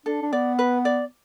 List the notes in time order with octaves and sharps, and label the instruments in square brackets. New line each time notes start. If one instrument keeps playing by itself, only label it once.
[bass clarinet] D4 [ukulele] A4
[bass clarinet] D4
[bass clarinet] B3 [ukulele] D5
[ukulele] B4
D5